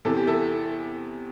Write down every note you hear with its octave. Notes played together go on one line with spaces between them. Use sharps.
E2 C3 E3 A4
G4
E4 A4